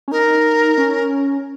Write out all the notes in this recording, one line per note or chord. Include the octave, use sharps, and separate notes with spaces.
C#4
D#4 A#4
C#4